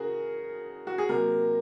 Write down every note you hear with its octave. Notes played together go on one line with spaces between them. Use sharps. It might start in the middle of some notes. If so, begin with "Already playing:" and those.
Already playing: C#3 F#4 G#4 A#4
F#4
G#4
C3 F#3 A#3 A#4